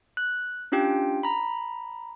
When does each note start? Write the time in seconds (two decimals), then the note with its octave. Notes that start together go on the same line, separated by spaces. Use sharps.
0.17 F#6
0.72 C#4 D4 F4 G4 G5
1.23 A#5 B5